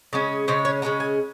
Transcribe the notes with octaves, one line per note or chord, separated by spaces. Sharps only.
C#3 G#3 C#4
C#3 G#3 C#4 C5
C#5
C#3 G#3 C#4 A#5
G#5